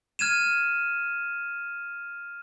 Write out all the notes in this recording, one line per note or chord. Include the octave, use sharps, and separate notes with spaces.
F6 G#6 D#7 E7